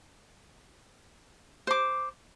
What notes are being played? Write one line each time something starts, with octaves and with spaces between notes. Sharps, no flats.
C5 D6